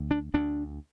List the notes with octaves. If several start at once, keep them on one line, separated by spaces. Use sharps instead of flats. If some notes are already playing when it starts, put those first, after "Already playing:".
Already playing: D2
D4
D2 D4